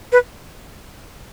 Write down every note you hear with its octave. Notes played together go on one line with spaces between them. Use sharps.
B4